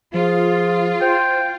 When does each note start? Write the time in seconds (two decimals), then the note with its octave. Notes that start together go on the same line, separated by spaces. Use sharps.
0.14 F3 F4 G#4
1.01 C5 G5